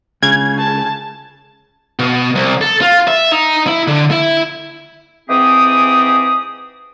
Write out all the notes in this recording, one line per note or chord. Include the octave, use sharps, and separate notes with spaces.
C#2 C#3 G#6
A5
B2
C2
A4
F4
E5
D#4
E4
D3
E4
G#2 E3 C4 G4 G#4 D#6